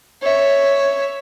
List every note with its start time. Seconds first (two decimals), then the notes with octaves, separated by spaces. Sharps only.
0.22 C#5 E5